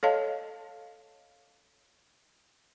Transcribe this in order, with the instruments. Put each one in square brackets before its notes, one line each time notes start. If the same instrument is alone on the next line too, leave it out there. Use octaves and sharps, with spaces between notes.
[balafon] A4 C#5 D#5 F5 A5